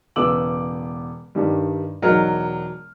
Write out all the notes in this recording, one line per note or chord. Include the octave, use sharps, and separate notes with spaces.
E1 C#3 B3 D6 E6 F#7
G2 D#3 G3
E1 F#3 D#4 A#4 F6